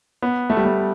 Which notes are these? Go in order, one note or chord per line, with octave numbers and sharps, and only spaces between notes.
B3
A3
G3
A3